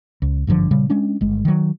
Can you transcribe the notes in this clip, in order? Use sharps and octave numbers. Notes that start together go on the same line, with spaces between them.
C#2
G#1 G2 D3 F3
A#2 C#3 G3
G#3 C#4 D4
G1 G#3
D#3 F#3